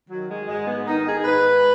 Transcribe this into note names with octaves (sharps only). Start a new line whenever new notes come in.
D#3 F#3
G#3
G#2 G#3
B3
D#3 D#4
G#4
G#4
G#2 B4